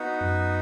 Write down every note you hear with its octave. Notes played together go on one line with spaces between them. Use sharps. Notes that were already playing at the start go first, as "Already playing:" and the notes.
Already playing: B3 D#4 F#4
F#2